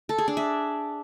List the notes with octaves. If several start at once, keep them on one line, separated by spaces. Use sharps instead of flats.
A4
G#4
D4
E5